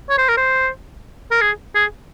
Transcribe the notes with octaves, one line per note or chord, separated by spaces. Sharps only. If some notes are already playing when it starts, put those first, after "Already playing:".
C#5
C5
A#4
C5
A#4
G#4
G#4